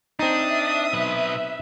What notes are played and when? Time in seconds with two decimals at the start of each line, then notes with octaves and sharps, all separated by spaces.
0.19 C4 D4 D#4 E5 D#6
0.93 B1 B4